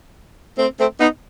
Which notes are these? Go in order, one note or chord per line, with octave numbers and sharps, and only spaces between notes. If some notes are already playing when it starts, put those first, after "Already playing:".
A3 C4
A3 C4
B3 D#4